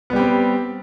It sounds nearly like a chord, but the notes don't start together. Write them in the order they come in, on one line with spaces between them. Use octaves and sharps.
B3 G3 G4 C4